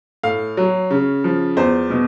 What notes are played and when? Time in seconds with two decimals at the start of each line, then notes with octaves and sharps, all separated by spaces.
0.23 A2 F5
0.57 F#3
0.91 C#3
1.24 F3
1.57 E2 C5
1.90 B2